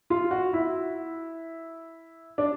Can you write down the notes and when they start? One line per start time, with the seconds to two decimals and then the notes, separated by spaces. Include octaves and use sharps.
0.10 F4
0.31 F#4
0.53 E4
2.38 D4